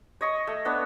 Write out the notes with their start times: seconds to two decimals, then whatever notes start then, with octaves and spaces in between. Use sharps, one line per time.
0.21 C#5 D#5 C#6
0.47 A3
0.65 B3 D4 C#5